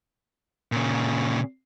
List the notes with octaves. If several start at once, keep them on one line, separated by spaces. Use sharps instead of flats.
A#2 C#3